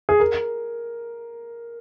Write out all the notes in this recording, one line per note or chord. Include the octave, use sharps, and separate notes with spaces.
G#4
A#4